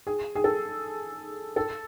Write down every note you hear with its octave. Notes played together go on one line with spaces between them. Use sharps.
G#4
G#4
A4
A4